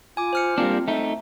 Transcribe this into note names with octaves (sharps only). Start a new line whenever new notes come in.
F4 G#5 D6
C5 F6 C#7
G3 A#3 C4 D4 F4
A3 D#4 E5